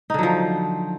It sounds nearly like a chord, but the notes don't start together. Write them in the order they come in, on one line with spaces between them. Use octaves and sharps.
D#4 D3 F#3 F3